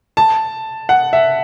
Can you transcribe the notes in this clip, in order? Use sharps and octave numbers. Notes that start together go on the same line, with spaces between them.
A5
F#5
E5